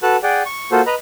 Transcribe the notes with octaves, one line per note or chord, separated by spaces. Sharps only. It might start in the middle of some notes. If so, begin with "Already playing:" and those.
F#4 A4 B4 A5 F#6
G#4 D5 F#5 G5
C#6
A#3 F4 F#4 A4 C5
B4 D#5 A#5 B5